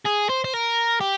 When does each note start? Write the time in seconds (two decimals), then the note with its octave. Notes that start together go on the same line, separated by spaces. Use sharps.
0.05 G#4
0.29 C5
0.44 C5
0.54 A#4
1.01 G4